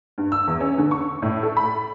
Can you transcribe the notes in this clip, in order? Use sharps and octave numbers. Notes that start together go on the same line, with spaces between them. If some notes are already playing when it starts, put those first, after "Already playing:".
G2
E6
E2
C#4
D3
C#6
A2
A4
B5